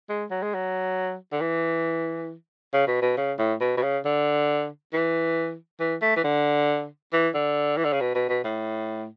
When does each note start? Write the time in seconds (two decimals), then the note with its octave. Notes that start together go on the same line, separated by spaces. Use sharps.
0.09 G#3
0.30 F#3
0.43 G#3
0.54 F#3
1.32 D3
1.41 E3
2.73 C#3
2.87 B2
3.02 B2
3.17 C#3
3.38 A2
3.61 B2
3.77 B2
3.83 C#3
4.05 D3
4.93 E3
5.80 E3
6.02 A3
6.16 E3
6.24 D3
7.13 E3
7.34 D3
7.77 E3
7.85 D3
7.93 C#3
8.01 B2
8.15 B2
8.29 B2
8.44 A2